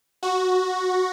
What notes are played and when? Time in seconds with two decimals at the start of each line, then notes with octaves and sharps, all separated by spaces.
0.23 F#4